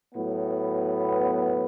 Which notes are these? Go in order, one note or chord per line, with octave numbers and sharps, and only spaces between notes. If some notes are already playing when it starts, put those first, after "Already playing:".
A2 F#3 B3